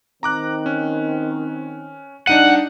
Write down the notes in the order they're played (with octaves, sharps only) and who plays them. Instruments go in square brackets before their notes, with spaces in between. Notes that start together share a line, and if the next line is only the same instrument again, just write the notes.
[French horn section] D#3 C4 [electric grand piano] A#5 D6 F#6
[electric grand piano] C#4
[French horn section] C#3 G3 [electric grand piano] D4 D#4 D#7 [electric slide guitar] F#5